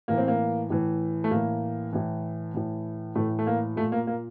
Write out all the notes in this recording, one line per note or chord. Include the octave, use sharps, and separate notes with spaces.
A2 E3 A#3
C4
A#3
A2 E3
A3
A2 E3 A#3
A2 E3
A2 E3
A2 E3 A3
A3
A#3
A#2 A3
A#3
A#3